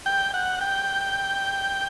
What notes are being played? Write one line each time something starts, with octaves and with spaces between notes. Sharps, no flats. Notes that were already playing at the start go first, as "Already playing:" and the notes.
G5
F#5
G5